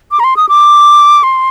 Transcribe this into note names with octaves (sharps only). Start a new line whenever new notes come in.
D6
A#5
C6
D#6
D6
C6